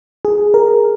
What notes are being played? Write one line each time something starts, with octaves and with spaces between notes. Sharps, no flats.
G#4
A#4